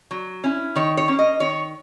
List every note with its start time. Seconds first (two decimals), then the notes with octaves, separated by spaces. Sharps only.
0.11 F#3
0.44 C#4 E4
0.76 D#3 C#5
0.97 C#5
1.08 A#3 C#4
1.19 D#5
1.40 D#3 C#5